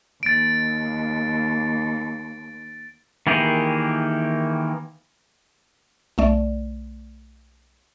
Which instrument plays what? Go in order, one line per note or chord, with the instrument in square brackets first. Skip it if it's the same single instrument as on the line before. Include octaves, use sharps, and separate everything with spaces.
[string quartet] D#2 [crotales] A6 D7
[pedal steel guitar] D#3 E3 A#3 G4 G#4
[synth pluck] B1 A3 D5